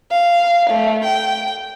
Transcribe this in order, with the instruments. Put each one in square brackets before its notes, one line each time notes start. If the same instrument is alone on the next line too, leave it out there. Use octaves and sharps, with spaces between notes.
[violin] F5
A3
G5